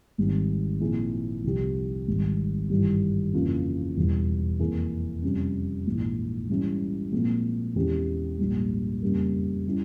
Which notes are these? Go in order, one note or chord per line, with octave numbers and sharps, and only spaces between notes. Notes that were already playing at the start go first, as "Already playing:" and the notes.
G#1 G#2 G3 C4
A#2 F3 C4 E4 G#4
C2 C3 F3 C4 G4
G#1 G#2 G3
G#1 G2 E3 G3
F2 C#3 E3 A#3 F4
E1 E2 E3 G3
F2 E3 A#3 E4 G#4
F2 C3 G3 C#4
A#1 G#2 E3
G#2 E3 G3 C#4 E4
A#2 F3 G#3 C4
E2 E3 G#3 C#4 G4
A#1 G#2 G3
F2 C#3 G3 A#3
G3 C#4 E4